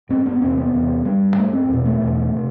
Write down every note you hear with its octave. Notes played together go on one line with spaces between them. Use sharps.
G2 C4
B3
E2 C3 C4
B3
E2 C3
G2 G3
G2 A3
C4
E2 B2
A3
E2 B2
C3